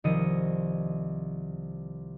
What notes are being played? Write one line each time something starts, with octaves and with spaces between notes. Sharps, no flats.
C2 D#3 F3 D#5 C#7 D#7